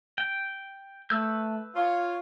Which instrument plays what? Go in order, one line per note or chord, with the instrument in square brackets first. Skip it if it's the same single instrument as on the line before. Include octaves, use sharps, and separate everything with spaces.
[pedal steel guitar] G5
[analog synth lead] A3 [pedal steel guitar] B4 E6 G6
[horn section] F4 [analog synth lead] C#5